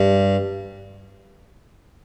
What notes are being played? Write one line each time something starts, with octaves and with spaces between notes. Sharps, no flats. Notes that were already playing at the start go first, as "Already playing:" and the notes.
Already playing: G2